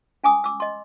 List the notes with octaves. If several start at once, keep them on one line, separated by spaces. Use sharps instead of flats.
C#4 G#5 D6 D#6
D6 E6
D#5 C6